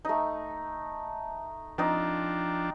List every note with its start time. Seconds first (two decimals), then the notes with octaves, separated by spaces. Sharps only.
0.05 A3 D#4
1.78 F3 C4 D4 D#4